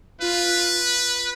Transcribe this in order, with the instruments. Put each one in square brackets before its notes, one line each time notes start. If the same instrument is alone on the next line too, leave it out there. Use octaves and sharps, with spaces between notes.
[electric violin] F4 [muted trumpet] B4